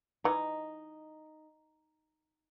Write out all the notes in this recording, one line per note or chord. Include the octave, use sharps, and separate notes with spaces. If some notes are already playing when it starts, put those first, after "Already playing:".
E3 D#4